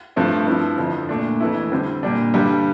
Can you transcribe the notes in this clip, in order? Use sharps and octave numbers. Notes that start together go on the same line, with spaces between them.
G2 F3 A3 C4
G2 F3 C4 E4
F2 D3 F3
A#2 A3 D4
F2 E3 A3 E4
D3 G3 C4
A#2 G3 D4
G2 D3 G3